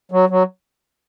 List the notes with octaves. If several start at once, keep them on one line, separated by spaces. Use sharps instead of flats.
F#3
F#3